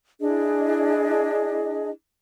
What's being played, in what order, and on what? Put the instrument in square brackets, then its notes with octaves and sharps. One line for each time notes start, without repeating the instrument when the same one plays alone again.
[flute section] D4 E4 G#4 D#5